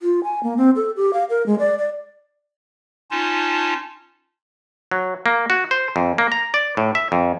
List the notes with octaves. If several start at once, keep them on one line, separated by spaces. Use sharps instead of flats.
F4
G#5
A#3
C4
A4
G4
F5
A#4
G#3
D5
D5
C#4 D#4 F4 A5
F#3
A#3
F#4
C5
F2
A#3
A#5
D5
A2
E5
F2